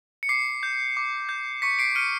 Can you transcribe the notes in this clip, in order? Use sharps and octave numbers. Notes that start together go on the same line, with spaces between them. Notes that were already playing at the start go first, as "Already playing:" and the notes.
C#7
D6 C7
G6
D6
G6
C#6 B6 C#7
C7 D7
F6 C#7 D#7